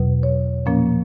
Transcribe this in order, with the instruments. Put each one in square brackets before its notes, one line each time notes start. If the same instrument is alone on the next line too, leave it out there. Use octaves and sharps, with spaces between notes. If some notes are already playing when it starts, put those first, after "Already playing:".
Already playing: [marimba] E2 B2 F#3 B4
C#5
A#2 F3 A#3 C#4